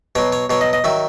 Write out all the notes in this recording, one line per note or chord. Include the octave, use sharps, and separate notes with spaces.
B2 F#3 C#5
C#5
B2 F#3 C#5
D#5
D#5
D#3 F#3 E5